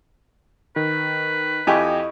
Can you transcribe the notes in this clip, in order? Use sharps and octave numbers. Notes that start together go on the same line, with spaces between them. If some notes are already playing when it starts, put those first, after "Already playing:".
D#3 B4
F2 E4 G4 D#5 G#5 C#6